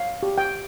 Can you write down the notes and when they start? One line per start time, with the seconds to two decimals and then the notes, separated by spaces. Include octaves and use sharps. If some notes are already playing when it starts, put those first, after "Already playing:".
Already playing: C#5 F5
0.23 G4
0.38 G5